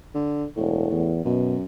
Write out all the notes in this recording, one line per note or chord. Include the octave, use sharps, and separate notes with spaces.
D3
E1 A2
E2
F#2 B2